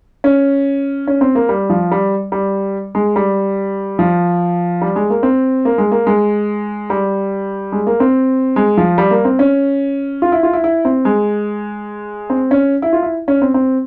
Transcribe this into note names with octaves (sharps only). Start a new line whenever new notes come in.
C#4
C#4
C4
A#3
G3
F3
G3
G3
G#3
G3
F3
G3
G#3
A#3
C4
A#3
G#3
A#3
G#3
G3
G#3
A#3
C4
G#3
F3
G3
A#3
C4
C#4
F4
E4
F4
E4
E4
C4
G#3
C4
C#4
E4
F4
E4
C#4
C4
C4